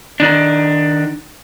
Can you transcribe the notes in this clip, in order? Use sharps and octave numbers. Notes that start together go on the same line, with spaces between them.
D#3 D4